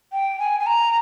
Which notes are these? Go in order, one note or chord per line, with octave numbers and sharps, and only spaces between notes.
G5
G#5
G#5
A#5